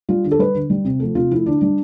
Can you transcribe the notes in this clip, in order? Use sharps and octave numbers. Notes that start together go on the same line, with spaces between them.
G3 F4
D3
A4
G3 B4
D3
G3
C3
F3 A3
C3 F4
F3 A3 E4
D3 D4
G3 D4